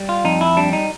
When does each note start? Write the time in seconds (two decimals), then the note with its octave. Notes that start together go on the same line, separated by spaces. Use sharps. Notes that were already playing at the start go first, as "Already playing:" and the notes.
Already playing: G3
0.09 F4
0.24 F2 D#4
0.41 E4
0.57 G3 D4
0.73 D#4